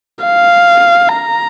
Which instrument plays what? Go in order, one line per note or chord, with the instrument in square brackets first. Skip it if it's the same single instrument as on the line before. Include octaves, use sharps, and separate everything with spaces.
[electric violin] F5
A#5